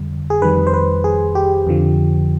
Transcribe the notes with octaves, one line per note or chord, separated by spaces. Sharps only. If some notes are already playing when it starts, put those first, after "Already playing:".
Already playing: F2 D3 G3
G#4
F2 D#3 G3 B4
C5
B4
G#4
G4
F2 D3 F3